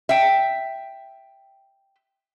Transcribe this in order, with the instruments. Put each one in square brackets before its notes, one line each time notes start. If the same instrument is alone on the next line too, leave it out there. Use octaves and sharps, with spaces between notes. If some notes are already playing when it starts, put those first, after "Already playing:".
[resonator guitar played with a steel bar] E5 G5